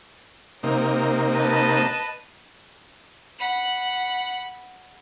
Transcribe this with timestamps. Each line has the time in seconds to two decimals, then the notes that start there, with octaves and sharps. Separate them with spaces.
0.63 C3 A#3 D#4 A#4
1.34 B4 D#5 A5
3.39 F#5 B5